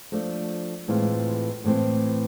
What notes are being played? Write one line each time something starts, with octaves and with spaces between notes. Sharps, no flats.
F3 A3 D4
A2 E3 G#3 C4 F4
A2 E3 A3 C4